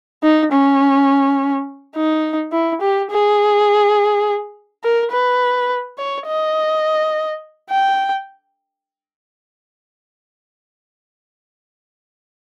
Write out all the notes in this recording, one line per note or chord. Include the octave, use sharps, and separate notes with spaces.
D#4
C#4
D#4
E4
G4
G#4
A#4
B4
C#5
D#5
G5